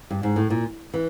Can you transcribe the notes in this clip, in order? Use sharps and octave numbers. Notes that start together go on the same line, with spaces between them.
G2
G#2
A2
A#2
E3